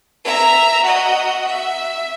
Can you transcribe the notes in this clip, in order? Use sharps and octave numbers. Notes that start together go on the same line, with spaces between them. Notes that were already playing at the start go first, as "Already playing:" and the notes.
E5 A#5
F#4 D#5
E5